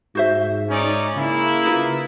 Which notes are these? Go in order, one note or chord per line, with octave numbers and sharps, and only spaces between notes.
G#2 F#4 C5 E5
C#4 D#4 D5
C#3 A#3 E4
D#4 F4 B4